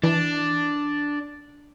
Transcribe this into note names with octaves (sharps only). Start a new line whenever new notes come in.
E3 D4